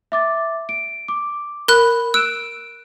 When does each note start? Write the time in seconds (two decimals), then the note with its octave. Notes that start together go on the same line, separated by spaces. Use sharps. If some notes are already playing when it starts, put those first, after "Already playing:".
0.12 E5 D6 A6
0.69 D7
1.08 D6
1.68 A#4 B5 F#6
2.14 E6 F#6 D7 E7